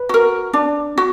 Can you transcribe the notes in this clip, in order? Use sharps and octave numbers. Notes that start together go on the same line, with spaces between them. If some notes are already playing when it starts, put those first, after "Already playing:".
Already playing: B4
F#4 A#4
D4
F#4